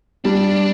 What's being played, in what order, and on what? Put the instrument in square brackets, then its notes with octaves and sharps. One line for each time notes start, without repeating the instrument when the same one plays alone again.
[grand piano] G3 [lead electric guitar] D4